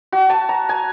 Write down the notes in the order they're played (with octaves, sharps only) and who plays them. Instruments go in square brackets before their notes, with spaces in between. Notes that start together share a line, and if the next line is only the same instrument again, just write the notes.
[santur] F#4
A5
A#5
G#5